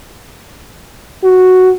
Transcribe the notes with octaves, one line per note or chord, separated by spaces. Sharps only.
F#4